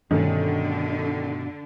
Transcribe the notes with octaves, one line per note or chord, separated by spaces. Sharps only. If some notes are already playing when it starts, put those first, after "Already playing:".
G2 B2 D3 D#3 A3 C#4